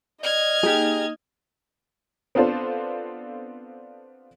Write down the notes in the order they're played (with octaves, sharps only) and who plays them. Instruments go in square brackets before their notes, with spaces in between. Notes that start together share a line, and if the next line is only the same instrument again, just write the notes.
[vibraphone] D5 [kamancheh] D#5 [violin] F6 G#6
[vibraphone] A#3 D#4 [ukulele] G4 G#4
[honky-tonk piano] B3 C4 D4 F4 A4 C5